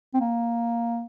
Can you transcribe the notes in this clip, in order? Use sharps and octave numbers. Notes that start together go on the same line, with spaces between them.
C4
A#3